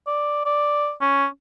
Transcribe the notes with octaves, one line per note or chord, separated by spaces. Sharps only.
D5
D5
C#4